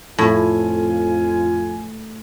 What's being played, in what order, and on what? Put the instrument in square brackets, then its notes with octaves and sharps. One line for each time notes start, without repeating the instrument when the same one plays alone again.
[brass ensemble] F2 F4 G#5 [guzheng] A2